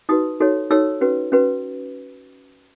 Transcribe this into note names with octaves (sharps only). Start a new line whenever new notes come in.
D#4 F#4 B4 D#6
D#4 F#4 A4 C#5
D#4 F#4 A4 C#5 E6
C#4 F#4 B4
C#4 F#4 B4